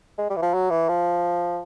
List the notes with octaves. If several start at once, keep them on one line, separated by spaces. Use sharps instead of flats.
G#3
G3
E3
F3
F#3
E3
F3